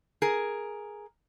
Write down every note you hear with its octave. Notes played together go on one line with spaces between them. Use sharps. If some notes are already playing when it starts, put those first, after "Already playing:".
G#4 A#4